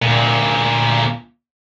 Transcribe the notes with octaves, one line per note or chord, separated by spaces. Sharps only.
D2 A#2